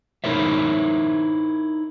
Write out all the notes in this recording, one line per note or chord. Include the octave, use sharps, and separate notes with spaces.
D#4 E4 A#4 C5 C#5 E5